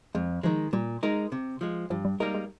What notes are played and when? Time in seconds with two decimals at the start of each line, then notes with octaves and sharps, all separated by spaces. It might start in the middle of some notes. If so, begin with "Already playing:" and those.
0.15 F2 G#3
0.43 D#3 F3 G#3
0.73 A#2 G3
1.03 G#3 D#4 A#4
1.32 C3
1.61 F3 G#3
1.90 G2 F3
2.05 G3
2.20 G3 G#3 A#3 D#4 A#4
2.35 G#3